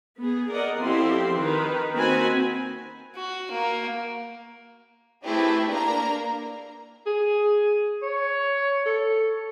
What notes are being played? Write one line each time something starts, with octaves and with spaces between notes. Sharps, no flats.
B3 G#4
A#4 D5 D#5 F#5
F3 C4 E4 G4 A4 C6
D#3 A#4 B4
D#3 A#3 C4 F#4 G#5 B5
F#4
A#3
A3 C4 E4 G4 G#4 B4
A#3 D4 A#4 A#5
G#4
C#5
A4